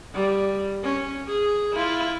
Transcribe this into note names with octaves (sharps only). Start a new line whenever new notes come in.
G3
C#4
G#4
E4 F4